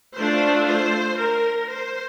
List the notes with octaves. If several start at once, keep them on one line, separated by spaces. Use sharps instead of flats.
A3 D4 F4 C5
C5
A#4
C5